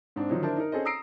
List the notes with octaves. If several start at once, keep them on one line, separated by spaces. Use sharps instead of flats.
G#2 C4 D4
D3 D#3 F3 F#3 D#4
D4 E4 A#4 C5 A5
D#4 A#4
C#4 G#4 A4 C5 D#5
A#5 D#6 E6 A#6 C7 D7